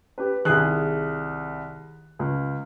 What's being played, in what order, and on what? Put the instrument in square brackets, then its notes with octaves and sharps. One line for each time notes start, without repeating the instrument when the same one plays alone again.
[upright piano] G4 B4
[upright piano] C2 F#6 [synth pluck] D#3 G#4
[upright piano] C#2